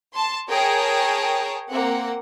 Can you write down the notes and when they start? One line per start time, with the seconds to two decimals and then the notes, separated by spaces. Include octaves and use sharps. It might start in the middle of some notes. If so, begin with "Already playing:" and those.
0.14 A5 C6
0.48 G#4 A#4 C#5 G5 A5
1.69 A#3 C4 F#5